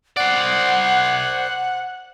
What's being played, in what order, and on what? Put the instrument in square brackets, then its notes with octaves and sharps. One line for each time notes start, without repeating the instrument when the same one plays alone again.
[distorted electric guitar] C5 D5 [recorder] F#5